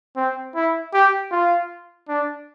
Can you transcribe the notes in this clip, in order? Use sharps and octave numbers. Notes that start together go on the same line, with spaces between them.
C4
E4
G4
F4
D4